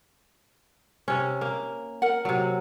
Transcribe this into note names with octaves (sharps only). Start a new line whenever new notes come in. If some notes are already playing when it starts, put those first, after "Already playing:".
C3 C#4
A#3
A#4 F#5
C3 F#3